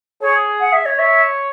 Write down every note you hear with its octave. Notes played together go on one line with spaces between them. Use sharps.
G#4 C#5
F#5
E5
C#5
C#5 E5